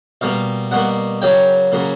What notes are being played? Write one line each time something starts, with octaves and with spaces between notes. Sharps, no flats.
B2 G3 A#3 F5
B2 G3 A#3 F#5
C#3 F#3 A#3 G5
C#3 F#3 A#3